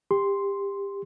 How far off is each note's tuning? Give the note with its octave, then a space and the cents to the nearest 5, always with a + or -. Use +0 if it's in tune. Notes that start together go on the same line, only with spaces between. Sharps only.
G4 +25 C6 +0